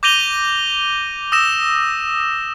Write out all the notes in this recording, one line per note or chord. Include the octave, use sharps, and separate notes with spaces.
D6 G6 A#6 D#7 F7 G7
D#6 E6 A#6 E7